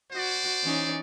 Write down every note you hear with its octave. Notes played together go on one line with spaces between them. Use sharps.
F#4 C5 D5
E3 C#4 D#4